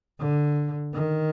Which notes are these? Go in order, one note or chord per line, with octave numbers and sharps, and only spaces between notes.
D3
D#3